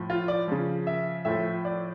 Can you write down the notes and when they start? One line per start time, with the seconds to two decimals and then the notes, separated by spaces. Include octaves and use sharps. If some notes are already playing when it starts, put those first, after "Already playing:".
Already playing: A2 F3
0.10 F4
0.28 D5
0.48 C#3 F3
0.87 E5
1.25 A2 F3 E5
1.65 D5